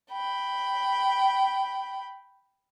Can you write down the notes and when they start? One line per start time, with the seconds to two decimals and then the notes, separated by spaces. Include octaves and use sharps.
0.12 G5 B5